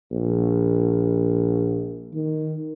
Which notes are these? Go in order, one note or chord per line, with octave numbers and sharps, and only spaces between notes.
A#1
D#3